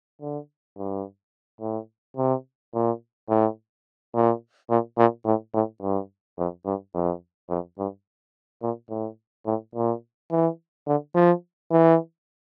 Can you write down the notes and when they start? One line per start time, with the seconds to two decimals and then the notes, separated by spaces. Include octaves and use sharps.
0.21 D3
0.77 G2
1.61 A2
2.17 C3
2.74 A#2
3.29 A2
4.14 A#2
4.70 A#2
4.97 A#2
5.25 A2
5.54 A2
5.81 G2
6.38 F2
6.66 G2
6.94 F2
7.49 F2
7.78 G2
8.62 A#2
8.90 A2
9.46 A2
9.75 A#2
10.31 E3
10.87 D3
11.14 F3
11.71 E3